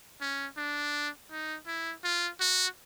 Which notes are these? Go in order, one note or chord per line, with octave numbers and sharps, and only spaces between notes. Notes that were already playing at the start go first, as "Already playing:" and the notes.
C#4
D4
D#4
E4
F4
F#4